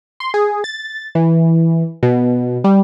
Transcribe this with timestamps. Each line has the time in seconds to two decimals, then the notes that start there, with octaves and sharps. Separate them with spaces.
0.20 C6
0.34 G#4
0.64 A6
1.15 E3
2.03 B2
2.64 G3